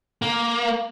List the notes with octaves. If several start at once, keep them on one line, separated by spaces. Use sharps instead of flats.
A#3